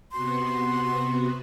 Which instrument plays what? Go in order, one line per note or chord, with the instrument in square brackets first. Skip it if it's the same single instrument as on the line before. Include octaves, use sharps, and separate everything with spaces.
[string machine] C3 B3 F#4 [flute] C6